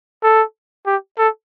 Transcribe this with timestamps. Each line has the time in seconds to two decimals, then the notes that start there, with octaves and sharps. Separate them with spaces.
0.23 A4
0.86 G4
1.18 A4